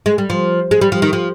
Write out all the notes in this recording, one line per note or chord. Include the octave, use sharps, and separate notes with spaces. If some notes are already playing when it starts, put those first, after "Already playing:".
G#3
G3
F3
G#3
G3
F3
D#3
F3